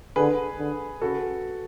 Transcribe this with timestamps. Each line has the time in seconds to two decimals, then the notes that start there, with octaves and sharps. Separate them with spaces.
0.16 D3 G#4 B4
0.59 D3
1.01 C#3 F#4 A4